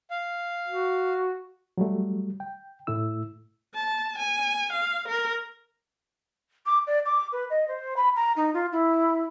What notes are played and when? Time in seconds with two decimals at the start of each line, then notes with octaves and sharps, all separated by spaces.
0.10 F5
0.68 F#4
1.78 F#3 G3 A3
2.40 G5
2.87 A2 A3 E4 E6
3.75 A5
4.18 G#5
4.73 F5
5.08 A#4
6.66 D6
6.87 D5
7.05 D6
7.32 B4
7.50 D#5
7.68 C5
7.96 B5
8.15 A#5
8.36 D#4
8.53 F4
8.72 E4